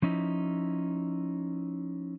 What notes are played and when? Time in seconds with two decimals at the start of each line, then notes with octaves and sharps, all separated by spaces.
0.02 F3 C#4 D#4 E4